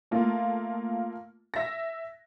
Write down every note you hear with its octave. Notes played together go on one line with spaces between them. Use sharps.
A3 A#3 F4
E5 A#6